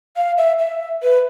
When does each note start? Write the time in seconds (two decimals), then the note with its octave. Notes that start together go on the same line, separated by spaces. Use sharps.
0.17 F5
0.38 E5
0.59 E5
1.03 B4